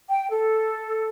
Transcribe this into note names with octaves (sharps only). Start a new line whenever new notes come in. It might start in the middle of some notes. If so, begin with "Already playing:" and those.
G5
A4